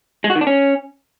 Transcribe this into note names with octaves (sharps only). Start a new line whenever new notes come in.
G#3
F#4
D#3
D4
C#4